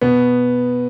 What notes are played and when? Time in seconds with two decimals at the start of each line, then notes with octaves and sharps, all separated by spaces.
0.01 B2 B3